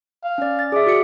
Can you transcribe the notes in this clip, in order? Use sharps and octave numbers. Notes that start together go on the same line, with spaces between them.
F5
C#4 D5
A6
G#4 D5 E5
F#4 C#7